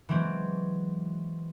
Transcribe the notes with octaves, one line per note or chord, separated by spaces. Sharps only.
E3 F#3 G#3 C4